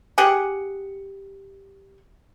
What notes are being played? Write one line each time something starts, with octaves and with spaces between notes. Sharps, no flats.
G4 G#4 F#5